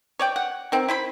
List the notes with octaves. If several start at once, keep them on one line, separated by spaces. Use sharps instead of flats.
C#5 D5 G5
F#5
D#3 C4
E4 C5 B5